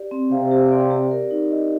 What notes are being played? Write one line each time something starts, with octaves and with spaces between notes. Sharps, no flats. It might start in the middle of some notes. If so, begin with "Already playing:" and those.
Already playing: G4 D5
C4
C3 F5
G4
D5
G4
A#4
D#4
D#5